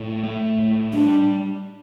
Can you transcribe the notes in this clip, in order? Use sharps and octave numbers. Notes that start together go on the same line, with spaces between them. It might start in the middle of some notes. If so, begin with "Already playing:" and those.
Already playing: A2
A3
A2
G3 D4